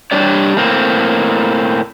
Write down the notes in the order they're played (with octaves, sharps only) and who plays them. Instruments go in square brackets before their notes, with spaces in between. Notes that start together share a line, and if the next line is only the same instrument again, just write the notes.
[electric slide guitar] G3 D4 G4 C#5 D5
A2 A#3 C4